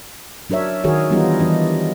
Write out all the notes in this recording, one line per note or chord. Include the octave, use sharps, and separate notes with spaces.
F#3 D4 A#4 C#5 E5
D#3 F#4 G#4 A#4 C#5
E3 G3 B3 D4 D#4 F4
E3 D4 D#5